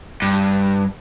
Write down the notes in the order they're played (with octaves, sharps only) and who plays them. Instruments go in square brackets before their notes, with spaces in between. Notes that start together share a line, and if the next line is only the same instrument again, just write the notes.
[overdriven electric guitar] G2